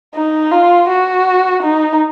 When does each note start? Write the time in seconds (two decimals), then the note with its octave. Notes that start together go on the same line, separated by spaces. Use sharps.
0.15 D#4
0.52 F4
0.89 F#4
1.63 D#4